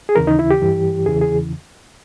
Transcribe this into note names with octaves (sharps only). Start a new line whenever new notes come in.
G#4
D#2 C#3 E3 A#4
D#4
E4
G4
G2 E3
E2 C#3 E3 G#4
G#4